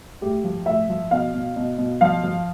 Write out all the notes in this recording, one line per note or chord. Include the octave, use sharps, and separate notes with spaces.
A2 G4
F3
A2 E5
F3
B2 F5
B2
B2
B2
F3 F5
F3